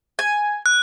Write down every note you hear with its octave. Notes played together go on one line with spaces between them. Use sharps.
G#5
F#6